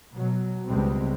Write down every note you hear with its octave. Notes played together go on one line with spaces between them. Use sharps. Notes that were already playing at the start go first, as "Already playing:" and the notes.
B2 F#3
C#2 G3 G#3 B3 C4